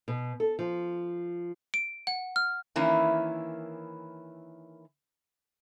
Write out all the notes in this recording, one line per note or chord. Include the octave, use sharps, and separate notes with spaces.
B2
A4
F3
D7
F#5
F6
D#3 E3 A#3 C#4 E4